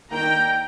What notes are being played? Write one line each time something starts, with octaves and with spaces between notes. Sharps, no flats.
D#3 A#3 D4 G5 A#5